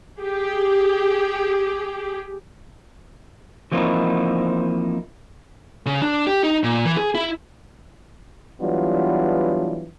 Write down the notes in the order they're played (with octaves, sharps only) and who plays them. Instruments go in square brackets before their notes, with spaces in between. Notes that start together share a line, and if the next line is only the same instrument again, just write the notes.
[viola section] G4 G#4
[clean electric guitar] E3 F3 A#3 C4 D#4 E4
[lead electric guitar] C#3
D4
G4
D#4
A#2
E3
G#4
E4
[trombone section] E3 F#3 G3 B3 D4 F4